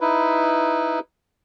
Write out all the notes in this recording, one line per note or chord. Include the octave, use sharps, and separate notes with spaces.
D#4 E4 B4